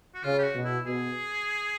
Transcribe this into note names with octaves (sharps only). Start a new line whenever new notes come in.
F#4
C#3 F4
G4
F#4
B2
E4
B2 G#4